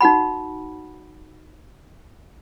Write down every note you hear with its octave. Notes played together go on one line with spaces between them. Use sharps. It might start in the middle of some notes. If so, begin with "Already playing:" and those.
D#4 F#4 F#5 B5